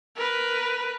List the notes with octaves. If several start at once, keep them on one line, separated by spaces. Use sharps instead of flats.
A#4 B4